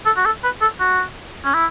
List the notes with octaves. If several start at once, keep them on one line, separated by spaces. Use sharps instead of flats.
A4
F#4
A4
B4
A4
F#4
C#4
E4